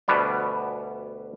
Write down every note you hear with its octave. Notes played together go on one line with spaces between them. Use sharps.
D2 B2 G3 B3 D4